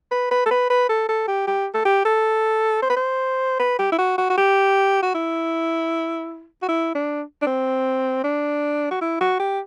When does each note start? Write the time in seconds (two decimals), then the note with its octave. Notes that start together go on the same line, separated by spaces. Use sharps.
0.12 B4
0.31 B4
0.46 A4
0.51 B4
0.70 B4
0.90 A4
1.09 A4
1.28 G4
1.47 G4
1.75 A4
1.86 G4
2.05 A4
2.83 C5
2.90 B4
2.97 C5
3.60 B4
3.79 G4
3.92 E4
3.99 F#4
4.18 F#4
4.30 F#4
4.38 G4
5.03 F#4
5.15 E4
6.62 F#4
6.69 E4
6.95 D4
7.42 D4
7.47 C4
8.24 D4
8.91 F#4
9.02 E4
9.21 F#4
9.40 G4